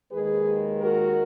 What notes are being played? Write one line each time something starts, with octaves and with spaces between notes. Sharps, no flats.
D#2 D#3 G#3 G#4 B4
F#4 A#4